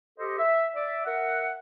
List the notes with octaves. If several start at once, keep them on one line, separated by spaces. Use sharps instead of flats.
G4 A4 C5 D#5
E5
D5 E5
A#4 E5 F#5